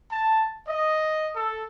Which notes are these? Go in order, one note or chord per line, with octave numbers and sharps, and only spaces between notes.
A5
D#5
A4